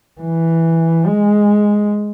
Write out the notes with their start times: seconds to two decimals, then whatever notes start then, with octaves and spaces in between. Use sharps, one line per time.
0.21 E3
1.06 G#3